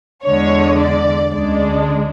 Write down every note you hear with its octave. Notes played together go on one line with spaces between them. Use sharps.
E2 D3 G#3 C#5
D5
D2 C#3 G#3 D4 D5